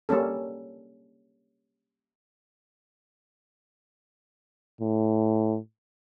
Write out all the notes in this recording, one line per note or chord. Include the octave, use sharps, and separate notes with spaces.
G3 A#3 C#4 A4
A2